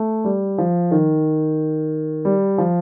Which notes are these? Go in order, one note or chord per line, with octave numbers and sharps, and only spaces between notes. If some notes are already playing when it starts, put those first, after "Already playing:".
Already playing: A3
G3
F3
D#3
G3
F3